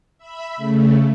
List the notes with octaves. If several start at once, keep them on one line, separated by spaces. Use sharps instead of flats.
E5 B5
C#3 A3